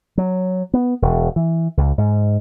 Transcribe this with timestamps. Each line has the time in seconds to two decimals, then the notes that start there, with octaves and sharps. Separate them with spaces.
0.18 F#3
0.74 B3
1.02 E1
1.36 E3
1.77 C#2
1.98 G#2